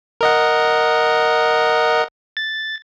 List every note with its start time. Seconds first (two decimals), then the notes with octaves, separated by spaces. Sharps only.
0.21 A#4 D#5 F#5
2.37 A6